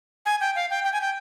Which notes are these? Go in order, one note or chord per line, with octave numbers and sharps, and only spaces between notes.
G#5
G5
F5
G5
G5
G#5
G5